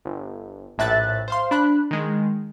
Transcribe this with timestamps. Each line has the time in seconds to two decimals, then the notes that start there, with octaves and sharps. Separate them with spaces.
0.05 G1
0.78 A#1 A2 E5 F#6 A6
1.28 C5 F5 C6
1.51 D4 B5 F#6
1.91 D#3 G#3